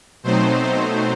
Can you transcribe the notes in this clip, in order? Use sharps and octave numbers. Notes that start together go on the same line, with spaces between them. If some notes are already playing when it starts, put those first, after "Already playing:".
B2 F#3 A3 C4 D#4 C5
C5